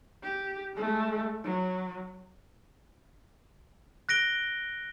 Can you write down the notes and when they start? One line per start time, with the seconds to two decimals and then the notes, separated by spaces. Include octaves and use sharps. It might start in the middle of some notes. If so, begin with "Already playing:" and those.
0.23 G4
0.75 G#3 A3
1.44 F#3
4.09 F#6 A#6 D7 G7